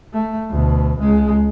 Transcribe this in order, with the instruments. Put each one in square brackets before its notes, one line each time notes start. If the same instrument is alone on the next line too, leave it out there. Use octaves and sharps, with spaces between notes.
[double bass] A3
D2 B2
C#2 G#3